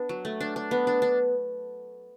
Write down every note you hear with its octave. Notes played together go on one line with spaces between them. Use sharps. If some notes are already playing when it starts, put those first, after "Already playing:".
Already playing: B3 D4
F#3
A3
D4
D4
B3
D4
D4